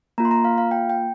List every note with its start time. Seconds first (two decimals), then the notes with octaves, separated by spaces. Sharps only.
0.18 A#3 F4 A#5
0.25 C6
0.31 A#5
0.45 F5
0.58 F5
0.71 G5
0.90 G5